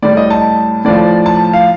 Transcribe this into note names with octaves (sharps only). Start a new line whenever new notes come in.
A2 G3 D5
D#5
A5
A2 F3 D5
A5
F5